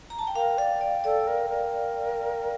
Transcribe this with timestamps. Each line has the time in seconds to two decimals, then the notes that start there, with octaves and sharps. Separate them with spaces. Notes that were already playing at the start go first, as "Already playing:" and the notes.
0.10 A#5
0.19 A5
0.27 G5
0.35 A#4 F5
0.58 D5 F5
0.81 D5
1.04 A4 D5
1.27 A#4
1.50 A#4